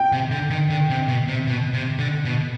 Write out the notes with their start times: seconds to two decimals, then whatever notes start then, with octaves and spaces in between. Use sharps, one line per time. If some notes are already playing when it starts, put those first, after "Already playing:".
Already playing: G5
0.12 C3
0.31 D3
0.51 D#3
0.70 D3
0.90 C3
1.08 B2
1.28 C3
1.47 B2
1.73 C3
1.99 D3
2.25 B2